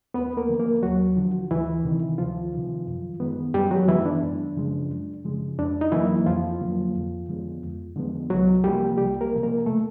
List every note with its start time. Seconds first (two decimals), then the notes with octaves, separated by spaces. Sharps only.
0.14 D#2 B3 B4
0.37 A#3 A#4
0.49 D3 F3
0.59 A#3 A#4
0.83 D#2 F#3 F#4
1.16 D3 F3
1.51 D2 E3 E4
1.84 C3 D#3
2.18 D2 F3 F4
2.52 C3 D#3
2.87 F#2
3.20 D#3 G#3 B3
3.54 F#2 G3 G4
3.71 F#3 F#4
3.88 D#3 E3 G#3 B3 E4
4.06 D4
4.23 F#2
4.57 C#3 F3 G#3
4.90 F#2
5.25 C#3 F3 G#3
5.58 F2 D4
5.81 D#4
5.92 D3 E3 F#3 A#3 E4
6.26 F2 F3 F4
6.60 D3 F#3 A#3
6.94 F2
7.29 D3 F3 G#3 B3
7.62 F2
7.96 D3 F3 G#3 B3
8.30 C2 F#3 F#4
8.64 C3 F3 G3 A#3 G4
8.97 C2 G3 G4
9.21 A#3 A#4
9.32 C3 F3 A#3
9.43 A#3 A#4
9.66 A3 A4